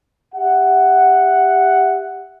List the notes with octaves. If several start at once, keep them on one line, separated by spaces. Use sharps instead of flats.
G4 E5 F#5